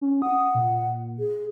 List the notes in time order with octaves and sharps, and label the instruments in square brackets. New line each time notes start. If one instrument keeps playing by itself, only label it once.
[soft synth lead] C#4
[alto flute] F#5 [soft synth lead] D#6
[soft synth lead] A#2
[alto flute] G#4